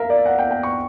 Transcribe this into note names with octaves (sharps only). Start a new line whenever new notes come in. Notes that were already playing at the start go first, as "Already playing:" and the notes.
Already playing: A#4 E5 F5
D5
F#5
G5
G5
C#6